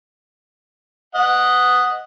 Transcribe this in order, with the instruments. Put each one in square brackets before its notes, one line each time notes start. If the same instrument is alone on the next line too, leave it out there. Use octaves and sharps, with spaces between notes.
[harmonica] D#5 F#5